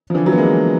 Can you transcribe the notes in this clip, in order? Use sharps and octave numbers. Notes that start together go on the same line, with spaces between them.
F3
D3 E3
E3 F#3
B3
G#3 A#3